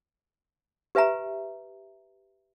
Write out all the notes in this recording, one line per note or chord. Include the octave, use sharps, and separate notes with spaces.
G4 B4 E5 G#5 A#5